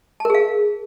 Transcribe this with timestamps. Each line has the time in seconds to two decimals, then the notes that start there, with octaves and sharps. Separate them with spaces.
0.20 A5
0.25 A#4
0.30 G#4
0.35 F5